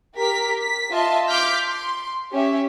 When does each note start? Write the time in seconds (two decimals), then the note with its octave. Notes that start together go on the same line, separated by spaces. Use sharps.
0.17 G4 A#4 B6
0.61 B6
0.92 F4 D#5 E5 A5 C6
1.27 C6 D6 F6 G6 B6
1.64 C6
2.32 C#4 G4 E5